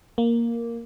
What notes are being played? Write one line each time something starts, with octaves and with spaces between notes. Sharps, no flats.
A#3